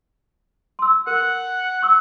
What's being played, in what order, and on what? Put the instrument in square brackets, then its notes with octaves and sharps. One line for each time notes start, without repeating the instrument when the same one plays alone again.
[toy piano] C6 E6
[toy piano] A#4 [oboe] F#5
[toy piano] C#6 E6